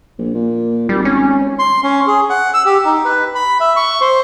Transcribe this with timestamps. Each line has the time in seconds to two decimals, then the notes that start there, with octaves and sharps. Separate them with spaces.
0.18 A#1
0.34 A#2
0.89 G#1 G3
1.05 C#4
1.59 C6
1.83 C#4
2.07 G#4
2.30 F#5
2.54 E6
2.65 G4
2.85 D#4
3.05 B4
3.35 B5
3.60 E5
3.76 C#6
4.01 C5